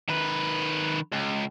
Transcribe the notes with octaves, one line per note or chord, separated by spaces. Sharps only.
D#3 B4
C#2